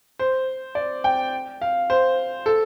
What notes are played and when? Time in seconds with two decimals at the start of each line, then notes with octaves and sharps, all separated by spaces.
0.19 C5
0.75 D5
1.04 G5
1.61 F5
1.90 C5
2.46 A4